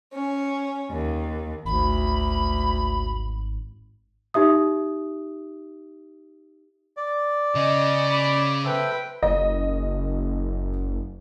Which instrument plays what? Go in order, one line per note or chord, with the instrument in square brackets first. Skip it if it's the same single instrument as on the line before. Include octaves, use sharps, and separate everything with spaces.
[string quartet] C#4
D#2
[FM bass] G#1 [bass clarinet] D2 [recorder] B5
[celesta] D#4 G4 E5 D#6
[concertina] D5
[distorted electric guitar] C#3 [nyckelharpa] D#5
[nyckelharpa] B5 D6
[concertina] A4 C5 E5 [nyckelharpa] B4 G5
[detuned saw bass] F#1 [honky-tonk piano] D#5